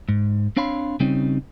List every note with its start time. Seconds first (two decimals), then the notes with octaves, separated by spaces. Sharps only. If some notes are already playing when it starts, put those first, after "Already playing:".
0.09 G#2
0.57 C4 D4 C#5 F5 B5 C6
1.00 C#3 G3 C4 C#4 D#4